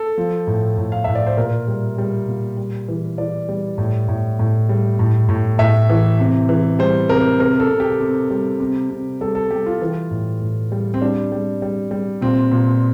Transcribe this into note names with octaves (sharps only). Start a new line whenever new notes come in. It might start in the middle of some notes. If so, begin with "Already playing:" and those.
Already playing: A4
F3
A2
A2
F5
A2 E5
D5
C5
A#2 A#4
G3
G3
A#2
G3
E3
E3 D5
G3
A2
A2
A2
G3
A2
A2
A2 E5
E3
C3
E3
G3 C5
C3 A#4
C3 A#4
A4
C3
G4
C3
G3
C3
C3
G3 A4
A4
G3 G4
F4
E3
A2
A2
G3
C4
G3 D4
G3
G3
G3
A#2 C4
A#2